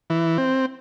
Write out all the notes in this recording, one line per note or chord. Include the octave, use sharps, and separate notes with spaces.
E3
C4